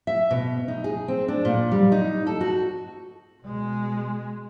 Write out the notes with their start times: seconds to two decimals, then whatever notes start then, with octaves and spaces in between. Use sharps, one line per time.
0.07 E5
0.31 B2
0.68 D#4
0.84 G#4
1.08 C4
1.28 D4
1.45 A#2
1.71 G3
1.92 D#4
2.27 A4
2.41 F#4
3.43 B2 G#3